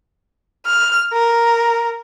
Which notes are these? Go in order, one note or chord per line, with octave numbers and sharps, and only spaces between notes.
F6
A#4